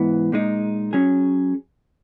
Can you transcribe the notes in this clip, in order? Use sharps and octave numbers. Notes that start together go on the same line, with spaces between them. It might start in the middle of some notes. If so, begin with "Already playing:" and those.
Already playing: G#2 E3 B3
A#2 G#3 D#4
F#3 C#4 G#4